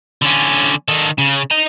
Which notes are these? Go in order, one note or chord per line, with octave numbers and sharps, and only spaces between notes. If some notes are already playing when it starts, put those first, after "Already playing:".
D3 C#4
D#3 A4
C#3
D#5 A#5